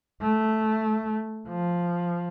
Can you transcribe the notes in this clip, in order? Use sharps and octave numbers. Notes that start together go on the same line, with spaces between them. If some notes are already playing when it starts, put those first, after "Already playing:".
A3
F3